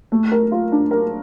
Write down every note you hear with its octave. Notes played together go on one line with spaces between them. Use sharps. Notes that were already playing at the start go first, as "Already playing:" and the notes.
A3
A#4
F4
D4
A#4